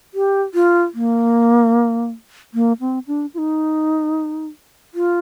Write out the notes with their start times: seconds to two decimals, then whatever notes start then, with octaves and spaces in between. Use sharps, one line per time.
0.14 G4
0.54 F4
0.94 A#3
2.54 A#3
2.80 C4
3.07 D4
3.34 F4
3.38 D#4
4.94 F4